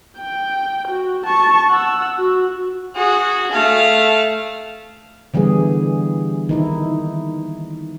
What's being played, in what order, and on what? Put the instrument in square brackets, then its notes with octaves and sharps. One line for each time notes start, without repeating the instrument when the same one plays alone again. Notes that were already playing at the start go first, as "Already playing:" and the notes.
[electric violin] G5
F#4
A5 C#6
F#5 E6
F#4
[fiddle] F#4 G#4
A3 F5
[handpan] D3 E3 G3 B3 G#4
D#3 D#4 E4